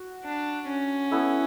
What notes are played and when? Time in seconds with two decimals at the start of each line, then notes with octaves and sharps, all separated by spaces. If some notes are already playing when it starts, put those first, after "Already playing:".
Already playing: F#4
0.25 D4
0.68 C#4
1.11 B3 E4 A4